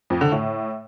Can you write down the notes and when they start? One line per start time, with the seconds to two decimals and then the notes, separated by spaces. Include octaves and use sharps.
0.10 F2
0.21 D3
0.32 A2